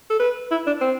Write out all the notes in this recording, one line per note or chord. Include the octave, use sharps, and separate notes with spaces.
A4
B4
E4
D4
C4